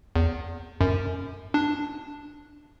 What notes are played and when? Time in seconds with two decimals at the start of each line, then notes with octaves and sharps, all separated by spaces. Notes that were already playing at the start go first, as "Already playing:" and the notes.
0.16 E2
0.81 F#2
1.54 D4